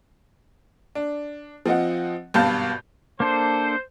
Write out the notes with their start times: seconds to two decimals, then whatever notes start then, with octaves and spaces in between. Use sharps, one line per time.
0.95 D4
1.66 F3 C4 D#5 F#5
2.34 G#1 G2 B2 F5 A5 G6
3.20 A#3 D4 A4 C5